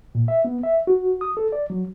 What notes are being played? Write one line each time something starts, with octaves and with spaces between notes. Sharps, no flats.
A#2
E5
B3
E5
F#4
D#6
A4
D5
F#3